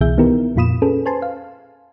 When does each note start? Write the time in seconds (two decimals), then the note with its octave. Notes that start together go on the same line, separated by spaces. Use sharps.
0.01 C2 B2 E3 G#4 E5 G6
0.18 D#3 B3 D#4 E4 G4 A#4
0.56 F2 A#2 F4 B5 D#6 E7
0.82 C#4 G#4 A4 B4
1.06 B4 C5 G#5 A5 C6
1.22 F5